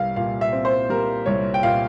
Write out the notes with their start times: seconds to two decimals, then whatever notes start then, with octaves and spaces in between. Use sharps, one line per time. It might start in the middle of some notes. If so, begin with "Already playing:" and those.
Already playing: C2 G3 F5
0.16 A#2 F5
0.41 E5
0.53 C4
0.65 C5
0.89 G3 A#4
1.26 C2 C#5
1.54 G5
1.63 A#2 F5